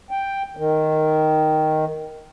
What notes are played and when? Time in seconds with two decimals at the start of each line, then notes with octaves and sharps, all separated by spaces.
0.11 G5
0.57 D#3